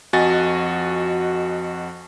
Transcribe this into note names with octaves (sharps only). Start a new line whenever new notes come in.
F2 F#4 D#5 G#5 A6